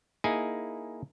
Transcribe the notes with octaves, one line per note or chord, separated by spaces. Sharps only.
A#3 D#4 E4 G#4 G#5